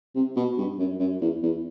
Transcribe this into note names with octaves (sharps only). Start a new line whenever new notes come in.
C3
B2
G2
F#2
F#2
E2
E2